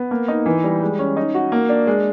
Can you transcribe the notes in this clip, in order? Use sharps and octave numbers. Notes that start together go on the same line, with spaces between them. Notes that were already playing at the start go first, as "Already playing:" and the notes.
Already playing: B3
A#3
D#4
E3
G3
G#3
C#4
D#4
F#4
A#3
D4
G#3